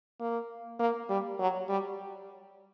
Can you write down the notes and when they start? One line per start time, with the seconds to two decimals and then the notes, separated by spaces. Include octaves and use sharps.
0.20 A#3
0.80 A#3
1.09 G3
1.39 F#3
1.69 G3